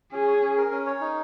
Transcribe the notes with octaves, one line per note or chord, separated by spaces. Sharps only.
C#4 G#4
C#5
C#4
A#4
C#4
C#5
D#4